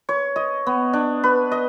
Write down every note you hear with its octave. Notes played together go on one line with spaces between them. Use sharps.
C#5
D#5
B3
D4
B4
D#5